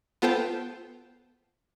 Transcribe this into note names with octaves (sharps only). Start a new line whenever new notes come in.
B3 F4 A4 C5 G5 A5